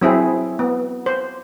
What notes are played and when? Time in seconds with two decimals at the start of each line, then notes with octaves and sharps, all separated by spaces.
0.01 F#3 C4 E4 G#4
0.59 B3
1.06 C5